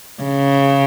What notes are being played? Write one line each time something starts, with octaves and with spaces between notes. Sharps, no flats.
C#3